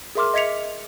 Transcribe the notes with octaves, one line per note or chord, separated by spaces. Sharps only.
G#4 A#4 E5 C6 D6 F6
D#5 E5 G#6 B6 C#7 F7